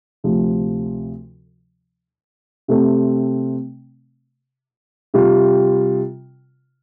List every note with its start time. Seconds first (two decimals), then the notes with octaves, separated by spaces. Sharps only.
0.24 D2 C3 F3
2.68 C3 A3 C4
5.14 C3 G3 F4